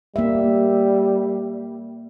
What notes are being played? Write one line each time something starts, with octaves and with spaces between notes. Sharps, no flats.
G3 A#3 E5